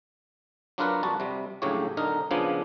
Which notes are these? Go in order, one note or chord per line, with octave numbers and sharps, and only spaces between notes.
F#3 D4 F4 A#4 B4 F#5
F2 G3 F#4 A5
C3 G3
A#1 A2 C#3 F#3 G4 C#5
B1 D3 D#4 A#4
A#2 C#3 F3 B3 D4 G#5